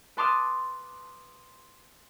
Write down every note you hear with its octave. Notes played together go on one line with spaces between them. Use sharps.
B4 A5 C6 D6 D#6 F6